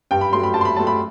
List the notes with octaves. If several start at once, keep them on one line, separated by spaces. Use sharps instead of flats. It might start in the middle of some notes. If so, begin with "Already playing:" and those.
G2 G5
B5
F#3 A3 C6
B5
G2 A5
C6
B5
F#3 A3 A5
B5